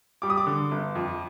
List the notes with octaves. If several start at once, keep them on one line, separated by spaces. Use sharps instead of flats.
G3 D6
D#6
D6
D3
G1
F2